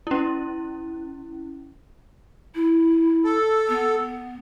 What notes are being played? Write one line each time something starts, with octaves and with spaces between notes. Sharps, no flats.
C#4 E4
E4
A4
B3